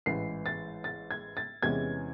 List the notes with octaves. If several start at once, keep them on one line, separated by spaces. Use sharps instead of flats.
A1 G#2 E3 G#3 C7
A6
A6
G#6
A6
E2 C3 E3 G#3 C#4 G#6